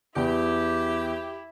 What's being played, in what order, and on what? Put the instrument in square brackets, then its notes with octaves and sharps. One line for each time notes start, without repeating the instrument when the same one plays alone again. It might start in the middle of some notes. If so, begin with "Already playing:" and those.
[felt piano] E2 [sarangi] E4 [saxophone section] G4